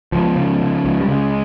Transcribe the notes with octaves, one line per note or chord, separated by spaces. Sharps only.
C#2 F3
C#3
C#3
C#2
G3
C#3 G#3